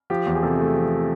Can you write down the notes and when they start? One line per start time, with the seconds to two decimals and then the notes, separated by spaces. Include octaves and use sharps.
0.10 F3 G4
0.27 E2
0.35 G#4
0.43 C3 A4
0.59 A3
0.76 F3